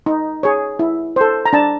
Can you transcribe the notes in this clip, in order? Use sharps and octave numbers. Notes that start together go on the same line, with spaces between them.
D#4
G#4 C#5
E4
A4 C5
A#5
D4 A5